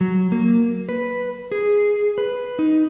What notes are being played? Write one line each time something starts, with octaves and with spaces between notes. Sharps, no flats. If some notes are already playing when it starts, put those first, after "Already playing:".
F#3
A#3
B4
G#4
B4
D#4